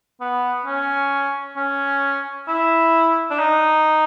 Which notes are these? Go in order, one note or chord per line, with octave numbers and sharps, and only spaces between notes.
B3
C#4
C#4
E4
D4
D#4